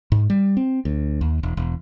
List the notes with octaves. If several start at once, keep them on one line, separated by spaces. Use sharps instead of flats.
G#2
G3
C4
D2
D#2
E1
E1